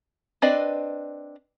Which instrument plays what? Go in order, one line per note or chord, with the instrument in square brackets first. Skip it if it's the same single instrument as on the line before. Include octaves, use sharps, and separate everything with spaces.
[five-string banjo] C4 D4 B4 D5 D#5